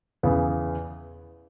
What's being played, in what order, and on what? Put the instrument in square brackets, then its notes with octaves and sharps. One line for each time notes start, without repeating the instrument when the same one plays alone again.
[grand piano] E2 C#3 E3 B3